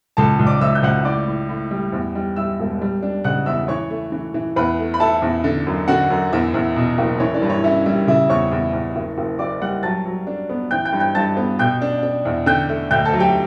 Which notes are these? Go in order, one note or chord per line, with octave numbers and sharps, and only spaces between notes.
C#2 A4 A5
C#2
D5 D6
C#2 E5 E6
G6
C#2 F#5 F#6
A2 D5 D6
A2
A2
G3
E2
G3
G3 E5 E6
E1
G3
D4
C#3 F#5 F#6
E2 E5 E6
E3 C#5 C#6
A3
E3
E3
E2 B4 B5
A3
B5
E4 A4 A5
E2
D3
F#2
D3 F#4 F#5
F#2
E2 E4 E5
E2
B2
F#1
E3 C#5
D4 D5
G2
C#5
C#4 E4 E5
G3 E4 E5
C#3 E4 E5
E2 C#5 C#6
E2
E2
F#1
F#1
F#1 D5 D6
G3 F#5 F#6
F#3 A5 A6
F#3
D4
B3
E3 G5 G6
G5 G6
G2
G5 G6
G2 A5 A6
B3
B2 G5 G6
D4
D4
E2
D3 G5 G6
A3
D2 G5 G6
A4 A5
F#3
G4 G5